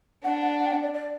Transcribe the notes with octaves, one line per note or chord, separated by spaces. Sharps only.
D4 F#5
F#5
F#5
G5
F#5
D5
D5